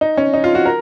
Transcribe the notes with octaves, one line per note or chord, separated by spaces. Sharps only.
D#4
C#4
D#4
F4
F#4
A#4